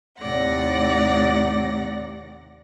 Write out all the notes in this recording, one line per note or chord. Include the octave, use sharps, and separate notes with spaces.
D#2 A2 C3 D5 F#5 A#6